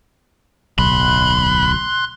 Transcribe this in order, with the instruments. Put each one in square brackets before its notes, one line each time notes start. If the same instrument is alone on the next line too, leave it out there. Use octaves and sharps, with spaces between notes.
[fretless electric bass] D1 B1 [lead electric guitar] B5 [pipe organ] C6 F#6